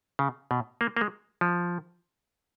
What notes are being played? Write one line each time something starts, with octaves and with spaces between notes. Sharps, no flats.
C#3
B2
A#3
A#3
G#3
F3